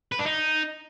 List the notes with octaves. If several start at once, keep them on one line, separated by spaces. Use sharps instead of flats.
B4
D4
D#4